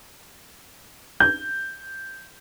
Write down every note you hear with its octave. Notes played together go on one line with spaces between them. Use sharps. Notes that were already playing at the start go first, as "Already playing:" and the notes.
G6